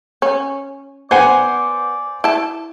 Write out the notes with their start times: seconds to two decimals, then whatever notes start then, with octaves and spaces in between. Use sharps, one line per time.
0.22 C#4
1.11 B3 C5 D5 F#5 G#5
2.24 E4 A5